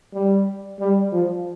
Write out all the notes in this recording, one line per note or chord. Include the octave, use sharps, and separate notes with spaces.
G3
G3
F3